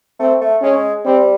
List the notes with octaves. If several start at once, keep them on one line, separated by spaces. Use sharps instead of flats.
A3 C4
A3
G#3 C#4
G3 C4